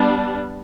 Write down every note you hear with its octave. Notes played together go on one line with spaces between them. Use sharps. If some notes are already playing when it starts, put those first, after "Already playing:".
Already playing: G3 B3 D4